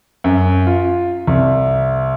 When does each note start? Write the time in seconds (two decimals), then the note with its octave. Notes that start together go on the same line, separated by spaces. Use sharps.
0.24 F#2
0.67 F4
1.27 C2